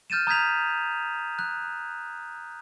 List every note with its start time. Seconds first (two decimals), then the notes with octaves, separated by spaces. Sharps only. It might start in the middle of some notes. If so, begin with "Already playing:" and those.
0.10 F6 G6 A6 D#7 E7
0.27 A#5 D#6 G6 G#6 B6 F7
1.39 F#6